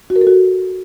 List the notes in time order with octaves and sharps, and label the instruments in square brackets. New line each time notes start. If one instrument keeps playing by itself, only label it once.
[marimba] F#4
A#4
A4
F#4